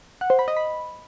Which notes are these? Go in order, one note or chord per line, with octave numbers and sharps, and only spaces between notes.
F#5
C5
B5
D#5
B5